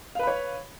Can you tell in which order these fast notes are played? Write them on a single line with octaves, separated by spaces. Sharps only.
F5 B4 B5 C#5